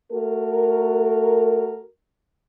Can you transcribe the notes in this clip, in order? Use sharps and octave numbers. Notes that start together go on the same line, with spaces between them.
A3 F#4 A4 A#4